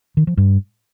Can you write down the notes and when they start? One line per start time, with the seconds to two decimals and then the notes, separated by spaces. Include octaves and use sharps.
0.17 D#3
0.27 F3
0.37 G2